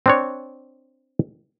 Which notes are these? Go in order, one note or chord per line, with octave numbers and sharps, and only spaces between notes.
C4 D4 C#5